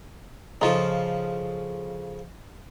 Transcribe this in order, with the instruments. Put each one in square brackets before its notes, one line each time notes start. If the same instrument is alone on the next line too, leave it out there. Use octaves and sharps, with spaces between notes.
[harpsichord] C#3 F3 A4 [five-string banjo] D#4 F4